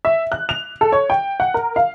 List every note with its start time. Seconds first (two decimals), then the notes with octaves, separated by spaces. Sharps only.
0.05 E5
0.32 F#6
0.49 F7
0.81 A4
0.92 C#5
1.10 G5
1.40 F#5
1.54 A#4
1.76 F5